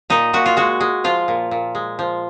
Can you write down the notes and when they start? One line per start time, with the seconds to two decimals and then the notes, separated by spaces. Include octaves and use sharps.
0.10 A#2 D#4
0.33 A#2 F#4
0.46 F4
0.57 G#3 F#4
0.80 G#3
1.04 F3 F4
1.28 A#2
1.51 A#2
1.75 G#3
1.99 F3